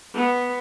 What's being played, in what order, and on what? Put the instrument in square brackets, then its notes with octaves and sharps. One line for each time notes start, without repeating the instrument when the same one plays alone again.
[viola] B3